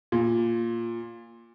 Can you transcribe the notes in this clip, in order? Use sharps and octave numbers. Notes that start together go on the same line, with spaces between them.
A#2